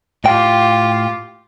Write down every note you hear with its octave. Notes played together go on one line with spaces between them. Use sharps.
A2 F4 G4 G5